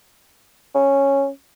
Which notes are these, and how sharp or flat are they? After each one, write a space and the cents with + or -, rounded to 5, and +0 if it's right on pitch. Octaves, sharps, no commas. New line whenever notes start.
C#4 -5